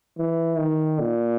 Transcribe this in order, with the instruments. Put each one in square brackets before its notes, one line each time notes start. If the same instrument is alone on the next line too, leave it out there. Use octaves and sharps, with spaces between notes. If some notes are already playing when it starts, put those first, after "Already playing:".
[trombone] E3
D#3
A#2